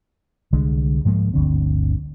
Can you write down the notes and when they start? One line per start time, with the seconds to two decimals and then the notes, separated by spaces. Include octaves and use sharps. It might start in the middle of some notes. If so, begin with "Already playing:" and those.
0.53 C2 D3 G3 G#3
1.05 G#2 F3 G#3 A#3
1.34 G1 D2 D3 C4